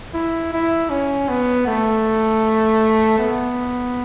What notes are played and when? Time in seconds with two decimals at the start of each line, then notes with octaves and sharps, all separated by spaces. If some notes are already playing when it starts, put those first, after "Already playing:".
0.14 E4
0.53 E4
0.90 C#4
1.29 B3
1.67 A3
3.18 B3